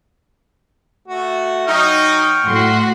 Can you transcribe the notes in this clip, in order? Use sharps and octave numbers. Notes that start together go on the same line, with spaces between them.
A3 F#4
F#3 D#4 G5 C#6 F6
A2 F#4 C6